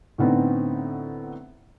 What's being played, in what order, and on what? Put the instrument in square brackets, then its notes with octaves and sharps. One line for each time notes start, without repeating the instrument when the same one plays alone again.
[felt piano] A2 D3 B3 C4 D#4